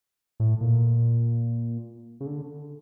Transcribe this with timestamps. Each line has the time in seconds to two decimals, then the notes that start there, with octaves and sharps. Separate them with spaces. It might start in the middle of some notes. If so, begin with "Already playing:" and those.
0.40 A2
0.61 A#2
2.21 C#3
2.26 D3